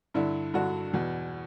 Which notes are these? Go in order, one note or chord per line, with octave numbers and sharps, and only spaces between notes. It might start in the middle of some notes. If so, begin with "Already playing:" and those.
G2 D3 E4
G2 D3 F#4
E2 B2